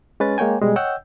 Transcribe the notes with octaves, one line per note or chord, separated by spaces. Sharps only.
G#3 C#4 B4 A6
G#3 A#3 C#5 G5 G#5
B2 G3 G#3
C#5 D#5 F#5 G5 E6 G6